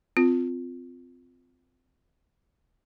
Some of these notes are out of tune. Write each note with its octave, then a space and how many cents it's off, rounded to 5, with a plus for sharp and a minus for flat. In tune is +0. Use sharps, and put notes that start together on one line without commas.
C4 -20 F4 +5